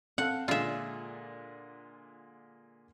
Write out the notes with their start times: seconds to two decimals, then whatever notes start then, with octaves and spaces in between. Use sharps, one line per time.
0.18 C4 A4 F5 F#5
0.48 A#2 D3 G#3 F4 E5